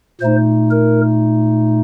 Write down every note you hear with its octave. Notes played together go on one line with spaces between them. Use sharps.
A#2 A3 D#4 C5
A#4